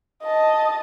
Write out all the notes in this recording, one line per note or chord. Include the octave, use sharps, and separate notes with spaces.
D#5 A5